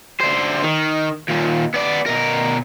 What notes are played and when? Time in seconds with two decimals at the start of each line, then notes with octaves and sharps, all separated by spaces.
0.21 D3 C5
0.64 D#3
1.29 D#2 A#2
1.74 B3 D5
2.06 B2 A#4